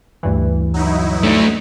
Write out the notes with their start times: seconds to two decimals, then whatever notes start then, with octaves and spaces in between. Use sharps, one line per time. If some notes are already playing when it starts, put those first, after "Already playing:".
0.23 D2 G2 E3
0.74 F#3 D#4 E4
1.23 A3 D4